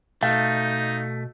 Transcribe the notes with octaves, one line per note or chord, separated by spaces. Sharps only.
B2 A3 D#4 F5